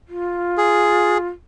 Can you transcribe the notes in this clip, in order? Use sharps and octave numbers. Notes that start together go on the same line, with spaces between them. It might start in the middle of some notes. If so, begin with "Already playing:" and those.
F4
G#4